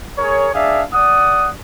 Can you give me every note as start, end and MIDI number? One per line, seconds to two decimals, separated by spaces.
0.18 0.48 68
0.18 0.48 70
0.18 0.48 73
0.54 0.82 62
0.54 0.82 68
0.54 0.82 74
0.54 0.82 76
0.54 0.82 77
0.93 1.49 74
0.93 1.49 78
0.93 1.49 87